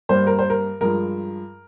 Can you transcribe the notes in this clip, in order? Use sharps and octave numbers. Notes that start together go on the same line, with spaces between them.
G2 G3 A#3 C5
A#4
C5
A#4
G2 F3 G#3 A#4